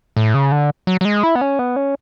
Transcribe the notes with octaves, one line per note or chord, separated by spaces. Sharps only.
A2
C#3
D3
F#3
F#3
G#3
E4
B3
C#4
B3
C#4